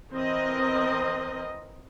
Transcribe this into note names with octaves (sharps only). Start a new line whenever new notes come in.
E3 C4 A#4 D#5